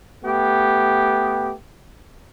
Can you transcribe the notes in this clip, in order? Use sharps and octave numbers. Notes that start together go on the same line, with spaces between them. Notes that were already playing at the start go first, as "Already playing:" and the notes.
A3 B3 G4